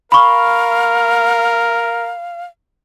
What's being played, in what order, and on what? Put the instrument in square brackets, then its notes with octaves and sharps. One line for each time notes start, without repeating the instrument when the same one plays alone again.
[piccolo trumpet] A#4 [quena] F5 [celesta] B5 C#6